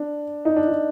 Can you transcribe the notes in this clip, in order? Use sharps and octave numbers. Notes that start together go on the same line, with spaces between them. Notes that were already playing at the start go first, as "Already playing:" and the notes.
Already playing: D4
D#4
D4
D#4